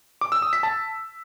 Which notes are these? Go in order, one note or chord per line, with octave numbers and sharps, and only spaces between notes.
D6
E6
D#6
B6
A5